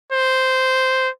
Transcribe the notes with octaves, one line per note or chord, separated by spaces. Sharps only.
C5